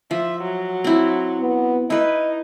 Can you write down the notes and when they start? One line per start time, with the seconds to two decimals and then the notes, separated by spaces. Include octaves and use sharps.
0.11 F3 E5
0.42 F#3
0.84 C4 E4
1.40 B3
1.90 D#4 E4 B4 D#5